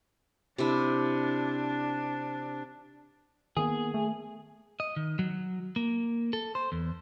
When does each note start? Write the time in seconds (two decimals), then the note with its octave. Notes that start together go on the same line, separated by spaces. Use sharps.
0.58 C3 D4 E4
3.57 D#3 A#3 B3 G#4
3.94 A3
4.80 D#5
4.96 D#3
5.19 F#3
5.76 A#3
6.33 A4
6.55 C5
6.72 E2